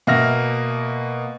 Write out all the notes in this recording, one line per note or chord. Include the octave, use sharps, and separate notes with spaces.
B2 A#3 E5 F#5 F6 A#6